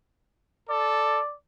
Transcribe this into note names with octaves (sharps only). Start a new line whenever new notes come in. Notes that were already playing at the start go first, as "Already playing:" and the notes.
A4 D5